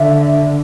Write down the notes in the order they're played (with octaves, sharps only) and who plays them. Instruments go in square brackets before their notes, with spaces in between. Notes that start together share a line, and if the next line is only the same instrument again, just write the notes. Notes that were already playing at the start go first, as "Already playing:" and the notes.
Already playing: [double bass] D3 [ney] E5